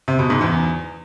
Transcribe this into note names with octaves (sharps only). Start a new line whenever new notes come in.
C3
B2
G#2
E2